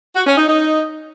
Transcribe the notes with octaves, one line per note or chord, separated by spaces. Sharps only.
F#4
C#4
D#4
D#4